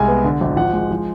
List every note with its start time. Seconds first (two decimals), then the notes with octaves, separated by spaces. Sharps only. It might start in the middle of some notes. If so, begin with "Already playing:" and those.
Already playing: C2 G#3 G#5
0.08 B3
0.25 D3
0.41 G#1
0.57 F3 F#5
0.73 G#3
0.91 F3